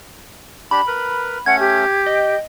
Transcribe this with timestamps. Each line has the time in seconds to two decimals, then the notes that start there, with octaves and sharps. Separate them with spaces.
0.71 D4 G4 B5
0.87 A#4 B4
1.46 A3 C#4 F#5 G#6
1.60 G4
2.06 D#5 G5